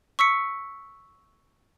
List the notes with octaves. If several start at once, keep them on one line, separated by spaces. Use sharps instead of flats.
C#6 E6 B6 C#7